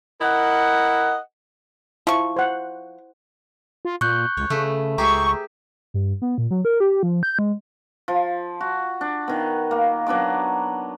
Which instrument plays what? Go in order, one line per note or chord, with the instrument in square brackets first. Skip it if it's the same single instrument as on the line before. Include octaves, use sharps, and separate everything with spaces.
[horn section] E4 A#4 D#5 F#5
[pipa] F3 C#6 [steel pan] E4
[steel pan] C5 F#5
[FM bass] F4
[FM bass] A#2 [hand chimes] C#6 F#6 G6
[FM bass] C#2 [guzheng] C#5
[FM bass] C#3 [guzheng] A3 B4
[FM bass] C#2 [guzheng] G4 G#4 E5 [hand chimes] A#5 [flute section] C#6
[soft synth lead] G2
B3
A#2
F#3
A#4
G4
F3
G6
G#3
[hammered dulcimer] F3
F#4
D4
D#3 B3
A#3
F#3 B3 D4 D6